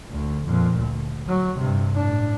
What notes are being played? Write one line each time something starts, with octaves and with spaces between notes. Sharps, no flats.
D2
F2 A#2
D2
F#3
G2 C3
A2 D4